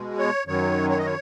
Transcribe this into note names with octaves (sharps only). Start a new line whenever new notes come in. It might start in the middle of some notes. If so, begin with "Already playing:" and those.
Already playing: B2 G#3
C#5
F#2 D#3 F#3 C#5
C#5
D#5
C#5